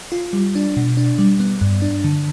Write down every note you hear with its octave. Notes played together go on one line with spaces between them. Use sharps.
F4
G3
D4
B2
D4
G3
B3
G2
D4
D3